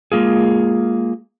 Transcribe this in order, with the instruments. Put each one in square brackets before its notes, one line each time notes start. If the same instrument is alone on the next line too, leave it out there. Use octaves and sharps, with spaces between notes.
[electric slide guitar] G#3 A#3 F4 G#4